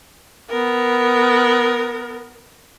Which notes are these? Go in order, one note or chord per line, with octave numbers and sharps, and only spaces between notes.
B3 A#4